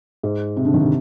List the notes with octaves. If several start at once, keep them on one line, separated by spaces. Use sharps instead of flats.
G#2
C3
D3
D#3
C3